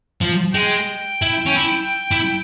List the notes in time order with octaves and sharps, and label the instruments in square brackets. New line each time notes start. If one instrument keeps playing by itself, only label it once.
[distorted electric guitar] F3
[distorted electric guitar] G#3 [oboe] G5
[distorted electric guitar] E4
C#4
E4
E4